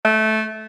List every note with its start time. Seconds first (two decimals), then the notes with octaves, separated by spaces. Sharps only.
0.05 A3